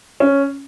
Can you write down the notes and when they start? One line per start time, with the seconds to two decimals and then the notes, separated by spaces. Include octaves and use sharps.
0.20 C#4